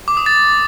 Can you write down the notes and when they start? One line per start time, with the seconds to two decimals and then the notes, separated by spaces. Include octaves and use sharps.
0.08 D6
0.17 D#6
0.26 A6